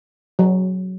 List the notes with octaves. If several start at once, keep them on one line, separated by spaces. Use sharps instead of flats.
F#3